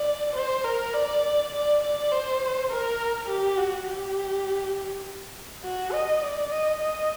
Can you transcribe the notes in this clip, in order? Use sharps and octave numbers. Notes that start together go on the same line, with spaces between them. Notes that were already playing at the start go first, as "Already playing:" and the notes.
Already playing: D5
C5
A#4
D5
D5
D5
C5
A#4
G4
F#4
G4
F#4
D#5
D5
D#5
D#5